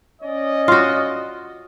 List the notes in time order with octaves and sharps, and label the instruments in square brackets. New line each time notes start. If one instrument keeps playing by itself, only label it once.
[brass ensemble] C#4 D5 D#5
[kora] F4 F#4